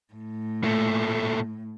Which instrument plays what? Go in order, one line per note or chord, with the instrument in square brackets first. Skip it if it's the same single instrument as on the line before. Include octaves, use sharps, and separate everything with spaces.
[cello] A2
[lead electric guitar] A#2 A3